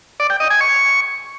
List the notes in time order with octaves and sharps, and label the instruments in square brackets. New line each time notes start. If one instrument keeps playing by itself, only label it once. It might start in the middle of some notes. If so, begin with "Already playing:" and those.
[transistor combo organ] D5
G5
D#5
G#5
C#6